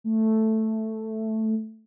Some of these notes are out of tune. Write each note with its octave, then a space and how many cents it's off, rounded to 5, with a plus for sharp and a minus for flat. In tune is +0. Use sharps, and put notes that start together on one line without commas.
A3 +0